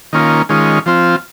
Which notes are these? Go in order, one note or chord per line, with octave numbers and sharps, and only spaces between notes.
D#3 A#3 C#4 F4
D#3 G#3 C#4 F4
F3 C4 F4